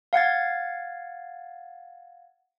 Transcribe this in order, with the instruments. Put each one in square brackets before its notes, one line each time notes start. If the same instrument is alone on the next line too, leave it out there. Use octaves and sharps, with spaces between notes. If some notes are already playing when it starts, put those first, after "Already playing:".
[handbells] F5 F#5 G#6 A6